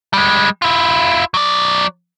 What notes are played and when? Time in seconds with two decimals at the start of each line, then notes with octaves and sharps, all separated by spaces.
0.13 G3 G#3
0.62 E4 F4
1.34 F#3 D5